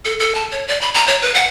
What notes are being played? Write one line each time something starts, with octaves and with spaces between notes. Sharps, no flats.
A4
A4
A5
C#5
D5
B5
A#5
C#5
B4
F#5